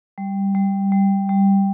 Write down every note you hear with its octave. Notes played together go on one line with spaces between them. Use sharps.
G3
G3
G3
G3